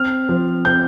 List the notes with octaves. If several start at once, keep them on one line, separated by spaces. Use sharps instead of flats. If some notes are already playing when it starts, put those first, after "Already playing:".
Already playing: C4 F6
F3
C4 G6